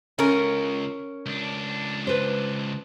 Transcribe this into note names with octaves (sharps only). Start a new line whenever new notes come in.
C#2 C#4 A#4
C#2 D4
B4 C5